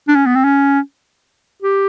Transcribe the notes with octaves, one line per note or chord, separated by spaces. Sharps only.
D4
C#4
B3
C4
C#4
G4